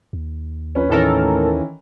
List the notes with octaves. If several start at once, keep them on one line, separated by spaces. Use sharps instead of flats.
D#2
A#1 C#4 B4
A2 D#3 E3 C#4 A4 A#4